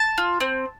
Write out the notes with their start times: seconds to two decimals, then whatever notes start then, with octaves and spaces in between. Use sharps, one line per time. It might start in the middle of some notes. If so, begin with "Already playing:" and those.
Already playing: A5
0.18 F4
0.40 C4